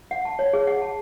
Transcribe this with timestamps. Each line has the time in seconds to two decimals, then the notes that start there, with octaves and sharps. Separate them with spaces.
0.11 F#5
0.25 A5
0.39 C#5
0.53 G#4
0.67 F#5
0.82 A5